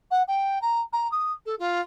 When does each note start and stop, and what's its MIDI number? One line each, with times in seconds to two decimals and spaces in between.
0.11 0.23 78
0.28 0.61 79
0.61 0.81 82
0.93 1.10 82
1.12 1.32 87
1.46 1.55 69
1.59 1.81 65